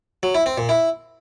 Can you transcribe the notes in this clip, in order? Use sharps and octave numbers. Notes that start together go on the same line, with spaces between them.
F#3
E4
C4
A#2
E4